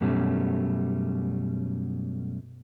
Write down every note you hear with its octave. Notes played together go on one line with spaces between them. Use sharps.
F#2 B2 G3 A3 C#4